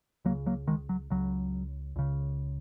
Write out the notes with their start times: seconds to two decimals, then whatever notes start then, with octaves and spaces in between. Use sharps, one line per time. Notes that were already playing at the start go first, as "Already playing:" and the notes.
0.25 C#2 F#3 A#3
0.29 C#3
0.46 F#3 A#3
0.67 D#3 G#3
0.89 F#3
1.10 C#2 C#3 F#3
1.96 C#2 C#3